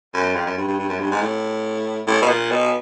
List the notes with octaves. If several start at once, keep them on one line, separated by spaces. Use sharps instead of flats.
F#2
F2
F#2
G2
G2
G2
F#2
G2
G#2
A2
A2
B2
A#2
B2